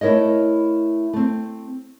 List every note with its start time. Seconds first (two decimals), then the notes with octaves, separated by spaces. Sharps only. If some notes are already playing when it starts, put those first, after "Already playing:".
0.01 A3 E4 A#4 C#5 D#5
1.13 A3 C4